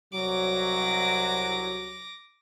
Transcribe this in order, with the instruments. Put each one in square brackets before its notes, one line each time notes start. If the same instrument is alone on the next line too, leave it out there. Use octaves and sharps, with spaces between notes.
[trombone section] C2 F#3 [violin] D6 A#6